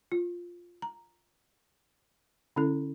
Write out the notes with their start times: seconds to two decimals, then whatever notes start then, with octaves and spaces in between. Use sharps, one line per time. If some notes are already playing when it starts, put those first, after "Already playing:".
0.12 F4
0.82 A#5
2.56 D3 C#4 E4 A4